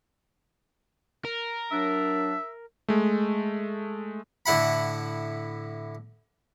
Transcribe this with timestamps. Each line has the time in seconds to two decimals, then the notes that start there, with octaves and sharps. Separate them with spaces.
1.25 A#4
1.71 F#3 D4 E5
2.88 G#3 A3
4.46 A2 D3 E4 F#5 B5